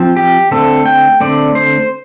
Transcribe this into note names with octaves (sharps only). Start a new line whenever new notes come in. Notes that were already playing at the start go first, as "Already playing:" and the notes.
Already playing: F3 C4
G4
D3 A3 C4 A4
G5
D3 A3 C4 D5
C5